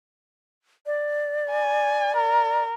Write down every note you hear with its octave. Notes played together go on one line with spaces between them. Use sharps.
D5
G#5
A#4